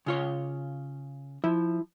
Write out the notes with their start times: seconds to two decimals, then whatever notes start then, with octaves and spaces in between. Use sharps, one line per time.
0.06 C#3 F4 C#5
1.44 F3 E4